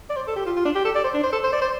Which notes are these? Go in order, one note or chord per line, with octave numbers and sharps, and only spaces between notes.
D5
C5
A4
G4
F4
F4
D4
G4
A4
D5
C5
D4
C5
A4
C5
D5
C5